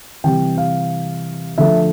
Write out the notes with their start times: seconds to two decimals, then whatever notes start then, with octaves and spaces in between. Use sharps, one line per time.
0.24 C3 E3 G3 G5
0.58 F5
1.58 D3 F3 A3 E5